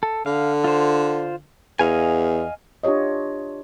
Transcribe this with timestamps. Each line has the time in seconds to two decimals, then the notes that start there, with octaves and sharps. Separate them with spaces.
0.03 A4
0.26 D3 F5
0.64 F4 C5
1.79 E2 D#5 F5 G#5
2.83 D4 F4 G4 C#5 D#5